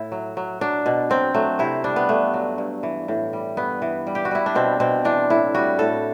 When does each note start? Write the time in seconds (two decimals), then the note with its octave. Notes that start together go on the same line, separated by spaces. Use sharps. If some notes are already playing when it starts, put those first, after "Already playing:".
Already playing: A2 E4
0.12 F#3
0.37 F#3
0.61 F#3 D4
0.86 B2
1.10 F#3 C4
1.34 F#3 A3
1.59 C3 E4
1.84 G3 D4
1.96 B3
2.09 G2 A3
2.34 F#3
2.58 G2
2.83 E3
3.08 A2
3.33 G3
3.57 G2 B3
3.82 E3
4.07 G3
4.15 G4
4.25 F#4
4.31 G3 E4
4.46 D4
4.55 B2 C4
4.80 B2 C4
5.05 E3 D4
5.30 A2 E4
5.55 G3 F#4
5.79 A2 A4